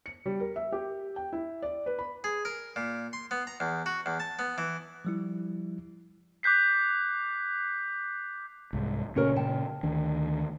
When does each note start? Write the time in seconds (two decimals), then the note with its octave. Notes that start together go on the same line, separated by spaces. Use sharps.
0.06 C#7
0.26 G3
0.40 A#4
0.56 E5
0.72 G4
1.16 G5
1.33 E4
1.62 D5
1.86 B4
1.99 B5
2.24 G#4
2.45 A#4
2.76 A#2
3.13 C6
3.31 B3
3.47 A#5
3.60 E2
3.86 F#4
4.06 E2
4.20 A5
4.39 B3
4.58 E3
5.05 F3 G3 E4
6.43 D6 F#6 G6 B6 C7
8.73 C2 G#2
9.16 A#2 C#3 C#4 A#4 C#5
9.36 G5 A5
9.83 D2 D#3 D4